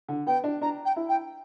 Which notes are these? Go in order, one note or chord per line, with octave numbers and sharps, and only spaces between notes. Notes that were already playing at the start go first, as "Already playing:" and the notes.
D3
B3 G5
D4
D4 A#5
G5
E4
G5